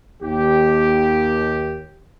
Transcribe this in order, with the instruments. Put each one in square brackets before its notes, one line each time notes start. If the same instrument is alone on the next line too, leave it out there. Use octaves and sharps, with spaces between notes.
[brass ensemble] D#2 G4